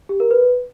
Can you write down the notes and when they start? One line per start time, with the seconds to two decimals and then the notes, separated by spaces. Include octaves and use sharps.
0.09 G4
0.20 A#4
0.31 B4